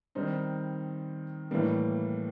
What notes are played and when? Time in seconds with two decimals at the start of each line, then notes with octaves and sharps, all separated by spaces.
0.15 D#3 G3 C4 D#4
1.51 A2 E3 G3 A#3